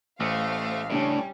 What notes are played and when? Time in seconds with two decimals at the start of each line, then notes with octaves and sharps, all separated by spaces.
0.20 A1 A3 C5 F5
0.90 A2 C#3 G3 C#4 D4 E5